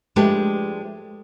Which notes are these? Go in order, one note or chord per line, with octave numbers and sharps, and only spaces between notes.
F3 G#3 A3 D4 G4 B4